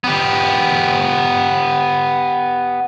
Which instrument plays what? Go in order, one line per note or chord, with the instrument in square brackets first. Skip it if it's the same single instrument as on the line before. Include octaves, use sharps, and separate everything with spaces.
[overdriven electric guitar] B3 G4